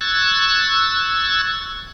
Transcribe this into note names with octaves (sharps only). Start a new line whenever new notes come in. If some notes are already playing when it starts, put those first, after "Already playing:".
C#6 E6 F#6 G#6 A6